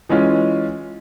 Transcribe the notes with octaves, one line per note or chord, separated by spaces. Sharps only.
E3 G#3 C#4 F4